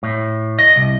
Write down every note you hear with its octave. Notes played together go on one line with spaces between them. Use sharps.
A2
D#5
C2